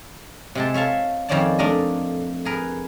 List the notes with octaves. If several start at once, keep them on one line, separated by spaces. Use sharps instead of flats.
C3 G#3 A5
C#5 E5 F5 A5
F2 D#3 F3 C#4 D5 A5
A3 D4 A#4 D#5
G#4 A#4 B4